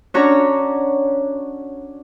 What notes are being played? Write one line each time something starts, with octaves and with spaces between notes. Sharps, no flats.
C#4 D4 F#4 C#5 A#5